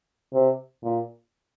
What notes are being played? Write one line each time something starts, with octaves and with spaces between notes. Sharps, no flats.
C3
A#2